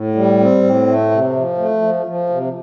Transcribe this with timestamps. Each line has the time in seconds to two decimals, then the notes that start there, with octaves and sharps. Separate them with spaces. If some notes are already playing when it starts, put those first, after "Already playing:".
Already playing: A2
0.15 G3
0.40 C4
0.64 A2
0.87 A3
1.11 C3
1.35 F3
1.58 A3
1.82 F3
2.06 F3
2.29 C3